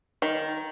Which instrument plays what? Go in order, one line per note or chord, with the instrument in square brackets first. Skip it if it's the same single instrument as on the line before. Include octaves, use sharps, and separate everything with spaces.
[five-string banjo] D#3